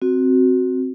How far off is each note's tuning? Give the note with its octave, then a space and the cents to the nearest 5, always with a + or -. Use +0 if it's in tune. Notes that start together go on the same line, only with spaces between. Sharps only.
C4 +0 F#4 +0